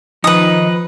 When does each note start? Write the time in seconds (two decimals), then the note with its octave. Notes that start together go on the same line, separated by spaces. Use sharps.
0.24 D#3 F3 D#4 B4 D#6